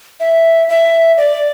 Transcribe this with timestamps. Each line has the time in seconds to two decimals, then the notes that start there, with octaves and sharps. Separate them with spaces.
0.20 E5
0.69 E5
1.17 D5